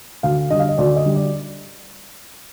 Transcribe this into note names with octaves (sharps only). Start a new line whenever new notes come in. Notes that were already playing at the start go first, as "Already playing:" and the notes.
D2 F5
D3 G3 D#5
F5
D#5
D2 D5
D#5
D3 G3
D5